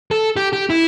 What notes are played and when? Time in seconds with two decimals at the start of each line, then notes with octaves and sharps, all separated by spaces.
0.11 A4
0.36 G4
0.53 G4
0.70 E4